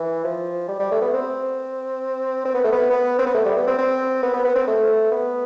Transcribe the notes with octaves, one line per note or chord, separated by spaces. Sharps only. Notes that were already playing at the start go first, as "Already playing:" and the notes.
Already playing: E3
F3
G3
G3
A3
B3
C4
C4
B3
A3
B3
B3
C4
B3
A3
G3
B3
C4
C4
B3
B3
B3
C4
A3
B3